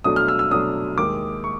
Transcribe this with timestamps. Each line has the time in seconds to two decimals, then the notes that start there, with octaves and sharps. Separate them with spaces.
0.04 B2 F#3 A3 D4 D#6
0.16 F6
0.28 E6
0.39 E6
0.51 B2 F#3 A3 D4 D#6
0.98 D#2 D#3 G#3 D6
1.44 C#6